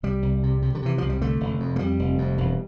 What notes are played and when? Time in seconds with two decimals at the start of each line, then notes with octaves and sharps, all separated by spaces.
0.03 C2 G3
0.22 C2
0.43 C3
0.62 C3
0.75 D3
0.82 C3 E3
0.98 C2 F3
1.09 G3
1.21 D3 A3
1.40 F1
1.60 F2
1.76 A3
1.79 F2 G3
1.99 F1
2.18 F2
2.38 E1